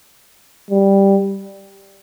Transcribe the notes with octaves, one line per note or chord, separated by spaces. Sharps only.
G3